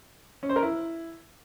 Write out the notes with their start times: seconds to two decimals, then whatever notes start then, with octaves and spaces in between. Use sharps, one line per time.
0.43 C#4
0.49 C5
0.56 A#4
0.63 E4